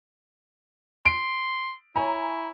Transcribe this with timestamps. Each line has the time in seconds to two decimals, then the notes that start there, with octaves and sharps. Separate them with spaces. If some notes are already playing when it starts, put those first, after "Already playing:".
1.05 C6 D7
1.96 E4 C#5 G#5 A#5